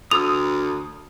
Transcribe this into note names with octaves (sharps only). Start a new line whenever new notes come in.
D2 D#6 E6 F7